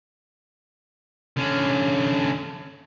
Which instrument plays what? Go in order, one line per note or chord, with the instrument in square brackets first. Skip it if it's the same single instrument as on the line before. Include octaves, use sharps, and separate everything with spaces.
[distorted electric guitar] D3 C#4